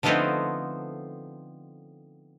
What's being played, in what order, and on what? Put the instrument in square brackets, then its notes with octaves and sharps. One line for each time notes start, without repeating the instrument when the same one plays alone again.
[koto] D3 F3 A3 B3 C4 D#4